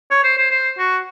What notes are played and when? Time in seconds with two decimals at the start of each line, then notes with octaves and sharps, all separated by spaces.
0.11 C#5
0.24 C5
0.38 C5
0.51 C5
0.78 F#4